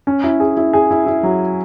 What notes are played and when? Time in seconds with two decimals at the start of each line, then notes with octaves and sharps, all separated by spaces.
0.07 C#4
0.24 E4
0.40 G#4
0.57 E4
0.73 G#4
0.91 E4
1.06 E4
1.23 F#3